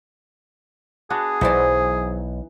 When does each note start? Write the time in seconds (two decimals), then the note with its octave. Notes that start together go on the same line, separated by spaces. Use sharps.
1.10 B3 D4 F#4 G#4
1.41 B1 E3 F#3 D#4 C5 D5